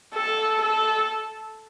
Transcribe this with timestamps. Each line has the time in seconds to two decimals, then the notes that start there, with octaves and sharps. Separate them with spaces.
0.15 A4
0.62 A4